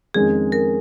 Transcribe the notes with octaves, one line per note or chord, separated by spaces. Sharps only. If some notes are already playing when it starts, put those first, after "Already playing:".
F2 D#3 G#3 C#4 G#4
A#4